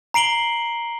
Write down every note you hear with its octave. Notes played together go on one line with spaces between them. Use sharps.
A#5 C7 D7 F#7 G7